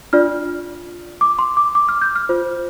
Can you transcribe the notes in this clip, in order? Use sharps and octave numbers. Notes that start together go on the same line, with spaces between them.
D4 F4 D5 F6
D6
C6
D6
D6
F6
G6
F6
F4 C5